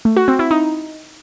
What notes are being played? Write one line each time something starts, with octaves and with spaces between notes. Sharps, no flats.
A3
F#4
C4
E4
D#4